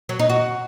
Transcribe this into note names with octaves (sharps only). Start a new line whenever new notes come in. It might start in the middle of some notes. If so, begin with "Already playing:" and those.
F#3
D#4
F#4